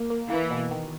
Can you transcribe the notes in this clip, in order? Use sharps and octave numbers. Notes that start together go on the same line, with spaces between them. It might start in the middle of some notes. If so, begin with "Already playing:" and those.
Already playing: A#3
A#3
E3 A#3
B2
D#3